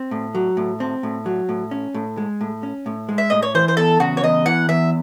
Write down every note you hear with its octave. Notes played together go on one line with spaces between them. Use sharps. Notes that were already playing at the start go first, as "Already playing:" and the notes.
Already playing: C4
A2
F#3
A2
C4
A2
F#3
A2
C#4
A2
G#3
A2
C#4
A2
G#3
E5
A2 D#5
C#5
E3 C5
C5
E2 A4
C#3 F#4
C#5
E2 D#5
E3 F#5
E2 E5